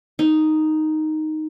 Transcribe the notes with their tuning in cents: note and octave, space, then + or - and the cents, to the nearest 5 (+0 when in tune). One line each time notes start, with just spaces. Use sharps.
D#4 +0